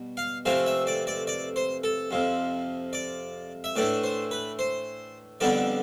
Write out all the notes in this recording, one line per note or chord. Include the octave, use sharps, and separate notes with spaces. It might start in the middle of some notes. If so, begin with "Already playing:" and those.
Already playing: B2 G3
F5
F2 C3 E3 A3 C4 F5
E5
D5
D5
D5
C5
A4
F2 C3 F3
D5
E5
A2 E3 A3 D4 D5
C5
B4
C5
F2 D3 G3 B3 D4 D5